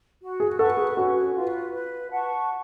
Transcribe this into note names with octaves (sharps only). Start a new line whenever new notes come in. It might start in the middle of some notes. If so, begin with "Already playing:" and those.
F#4
G#4
A4 B4 F#5 C#6
G#4
C#4 F#4
F4
B4
B4
F#5 A5 C#6